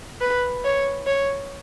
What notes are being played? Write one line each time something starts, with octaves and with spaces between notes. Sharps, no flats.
B4
C#5
C#5